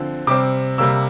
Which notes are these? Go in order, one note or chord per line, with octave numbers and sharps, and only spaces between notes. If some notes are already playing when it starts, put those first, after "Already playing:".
Already playing: D3 F3 C4
C3 G3 C4 D6
C3 G3 A#3 E6